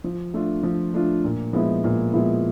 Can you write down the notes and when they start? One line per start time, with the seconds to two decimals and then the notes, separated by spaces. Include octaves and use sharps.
0.04 F3
0.34 A3 D4 F4
0.63 F3
0.94 A3 D4 F4
1.24 A#2
1.53 F3 G#3 B3 E4
1.84 A#2
2.13 F3 G#3 B3 E4